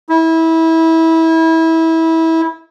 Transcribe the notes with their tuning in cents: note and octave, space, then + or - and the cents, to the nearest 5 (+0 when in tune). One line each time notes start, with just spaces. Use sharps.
E4 -25